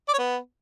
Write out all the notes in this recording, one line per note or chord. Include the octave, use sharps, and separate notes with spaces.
D5
C#5
B3